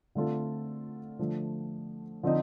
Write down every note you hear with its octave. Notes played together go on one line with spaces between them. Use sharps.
D3 A3 C4 F4 A4
D3 F3 A3
D3 F3 C4 D#4